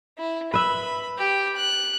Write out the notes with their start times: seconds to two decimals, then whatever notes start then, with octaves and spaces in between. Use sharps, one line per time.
0.18 E4
0.54 B4 E5 B5
1.18 G4 G5
1.56 F#6